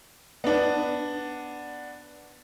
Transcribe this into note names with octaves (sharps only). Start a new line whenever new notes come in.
B3 D4